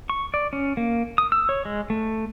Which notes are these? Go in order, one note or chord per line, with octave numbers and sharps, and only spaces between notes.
C#6
D5
C#4
A#3
D#6
E6
C#5
G#3
A3